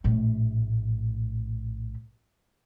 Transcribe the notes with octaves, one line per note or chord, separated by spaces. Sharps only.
A#1 A2